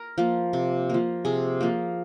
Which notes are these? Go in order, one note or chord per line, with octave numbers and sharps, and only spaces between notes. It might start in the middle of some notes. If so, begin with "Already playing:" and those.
Already playing: A#4
F3 A#3
C3
F3 A#3
C3 G#4
F3 A#3